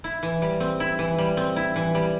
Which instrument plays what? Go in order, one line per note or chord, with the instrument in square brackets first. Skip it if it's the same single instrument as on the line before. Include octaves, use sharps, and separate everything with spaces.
[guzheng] E4
E3
G3
C4
E4
E3
G3
C4
E4
E3
G3